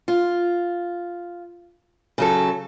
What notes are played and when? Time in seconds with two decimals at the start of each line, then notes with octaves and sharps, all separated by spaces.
0.08 F4
2.18 C#3 F#3 A4